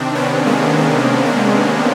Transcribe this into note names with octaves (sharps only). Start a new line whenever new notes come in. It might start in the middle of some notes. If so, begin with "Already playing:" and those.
Already playing: C3 D#3 C4 D4
B3 C#4
G#3 A#3
G#3
G#3 A#3